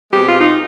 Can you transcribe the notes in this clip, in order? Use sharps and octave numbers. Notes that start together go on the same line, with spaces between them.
B2 G#3 C4 G4
F4
D#4